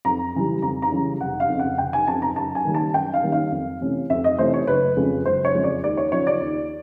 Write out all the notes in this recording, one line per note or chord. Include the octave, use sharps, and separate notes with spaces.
F2 A#5
C#3 E3 G3
F2 A#5
A#5
C#3 E3 G3
F1 F#5
F5
F2 C#3
F#5
F1 G5
G#5
F2 C#3 A5
A#5
F#2 A5
G#5
D#3 G3 A#3 C#4
A5
F#2 G5
F5
D#3 G3 A#3 C#4
F5
F2
C3 E3 A3 C#4
F2 E5
D#5
C3 E3 A3 C#4 C5
C#5
F#1 B4
F2 C#3 F3 G#3
F#1 C5
C#5
F2 C#3 F3 G#3
D5
D#2 D5
C#5
C#3 F3 C#5
D5
D#2